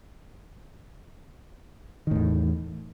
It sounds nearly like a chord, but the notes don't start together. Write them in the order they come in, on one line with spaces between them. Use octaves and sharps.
D#3 A2 E2